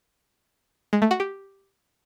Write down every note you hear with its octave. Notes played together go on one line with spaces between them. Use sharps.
G#3
A3
F#4
G4